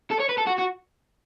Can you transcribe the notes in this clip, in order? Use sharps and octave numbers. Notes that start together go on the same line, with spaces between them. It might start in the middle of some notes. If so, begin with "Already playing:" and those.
A4
C#5
B4
A4
F#4
F#4